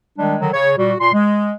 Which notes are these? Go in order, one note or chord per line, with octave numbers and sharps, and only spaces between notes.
D#3 G3 G#3 D4
D3 D#3 F#3
C#3 C#5
A#2 G3 F#4
A#2 C6
G#3